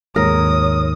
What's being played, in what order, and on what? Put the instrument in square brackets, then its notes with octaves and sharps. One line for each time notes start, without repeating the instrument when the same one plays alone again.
[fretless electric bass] D#2 G#2 [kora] A#4 [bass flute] C#5 [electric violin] D#6